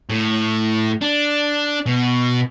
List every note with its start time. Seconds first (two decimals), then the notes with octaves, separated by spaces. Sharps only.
0.10 A2
1.01 D4
1.86 B2